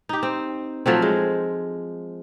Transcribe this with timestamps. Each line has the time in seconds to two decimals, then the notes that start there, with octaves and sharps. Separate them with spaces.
0.09 D#4 G4
0.23 C4
0.86 F3 F#3 A3 C4
1.02 G#3